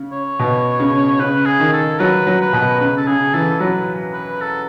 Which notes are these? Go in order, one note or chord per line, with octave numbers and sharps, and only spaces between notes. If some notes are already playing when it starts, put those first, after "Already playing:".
Already playing: C#3
C#5
B2
C#3
C#3 B4
G#4
D#3
A4
F#3 B4
F#3
B4
B2
C#3 B4
A4
C#3 G#4
E3 A4
F#3 B4
B4
A4